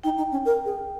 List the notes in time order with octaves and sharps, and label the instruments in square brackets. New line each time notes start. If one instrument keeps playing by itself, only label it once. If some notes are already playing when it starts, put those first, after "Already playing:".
[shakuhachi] D#4 [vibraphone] G5
[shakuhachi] D#4
C#4
A#4
G#4